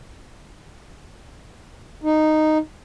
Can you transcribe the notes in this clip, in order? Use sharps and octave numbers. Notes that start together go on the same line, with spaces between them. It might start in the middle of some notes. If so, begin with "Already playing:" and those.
D#4